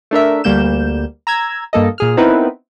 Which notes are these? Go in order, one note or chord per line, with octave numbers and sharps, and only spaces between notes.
A3 D4 A#4 E5
D2 G3 A#3 G6 E7
A#5 E6 G#6
G2 A#3 A4 D#5
A#2 G#4 F6
B3 C4 D#4 E4 A#4 B4